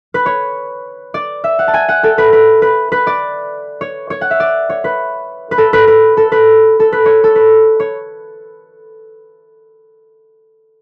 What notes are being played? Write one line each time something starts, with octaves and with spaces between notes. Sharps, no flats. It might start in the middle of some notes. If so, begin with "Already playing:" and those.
B4
C#5
D5
E5
F#5
A5
G#5
F#5
A4
B4
B4
B4
B4
D5
C#5
C#5
F#5
E5
D5
C#5
B4
B4
A4
B4
B4
A4
B4
A4
B4
C#5
A4
B4
C#5